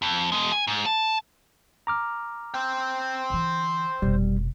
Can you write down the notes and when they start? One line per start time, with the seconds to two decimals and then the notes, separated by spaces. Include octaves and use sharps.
0.02 F2
0.32 B2 G#3
0.52 G#5
0.67 G#2
0.86 A5
1.87 A#5 D6 F6
2.54 C5 G5
3.30 D3 E3
4.02 F1 B2 G3